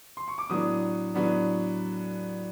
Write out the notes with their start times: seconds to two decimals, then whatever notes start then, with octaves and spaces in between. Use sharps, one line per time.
0.17 C6
0.28 C#6
0.38 D6
0.50 A2 F#3 B3 D4 D#6
1.14 A2 F#3 B3 D4